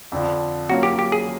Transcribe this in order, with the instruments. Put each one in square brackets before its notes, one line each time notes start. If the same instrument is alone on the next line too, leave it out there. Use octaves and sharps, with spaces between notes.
[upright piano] F2 D3 F3
[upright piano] F#3 A#3 C#4 F4 [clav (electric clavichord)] F#4
[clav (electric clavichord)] G4
G4
G#4